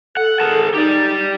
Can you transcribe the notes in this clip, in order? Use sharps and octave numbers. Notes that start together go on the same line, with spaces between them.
A4 F#5
G#4 A#4 A5
D#4 G4 D5